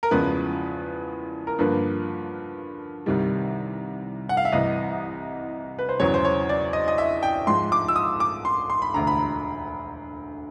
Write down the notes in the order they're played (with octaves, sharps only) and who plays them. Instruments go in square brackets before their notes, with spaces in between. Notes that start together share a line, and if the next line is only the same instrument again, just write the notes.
[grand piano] A#4
[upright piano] E2 C#3 F3 G#3 B3 [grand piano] B4
[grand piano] A#4
[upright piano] G2 D3 F3 A#3 [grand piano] B4
[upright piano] C2 C3 D#3 G3
[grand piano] F#5
F5
E5
[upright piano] C2 C3 E3 [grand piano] D#5
[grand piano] B4
C5
[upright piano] E1 E2 C#3 F#3 [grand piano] C#5
[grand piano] C5
C#5
D5
D#5
D#5
E5
G5
[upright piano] G#2 F3 G#3 [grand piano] C6
[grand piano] D6
E6
D#6
D6
C6
C6
B5
[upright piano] E1 D2 D3 [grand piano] A#5
[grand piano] B5